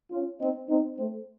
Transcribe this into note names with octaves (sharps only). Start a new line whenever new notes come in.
C#4 F4
C4 D#4
C4 D#4
A3 C4